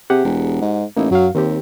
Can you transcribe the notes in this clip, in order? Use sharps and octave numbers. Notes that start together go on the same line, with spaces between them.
C3 G4 G#4 F#5
E1
G#2
A1 A#3 D#4 E4
F#2 F#3 F5
D#2 D#3 C4 G4